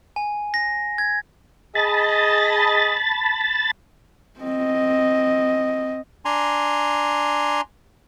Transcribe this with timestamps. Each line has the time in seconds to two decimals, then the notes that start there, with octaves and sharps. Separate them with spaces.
0.16 G#5
0.54 A#6
0.98 G#6
1.75 G#4 D#5 A5 B5 A6
4.40 C4 D#5
6.25 D4 G#5 A#5 C6